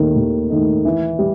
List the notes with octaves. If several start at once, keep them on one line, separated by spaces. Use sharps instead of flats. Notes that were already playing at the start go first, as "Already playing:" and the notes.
Already playing: D#2 D#3 A3 D#4
D#2
D#3 A3 D#4
E3
G3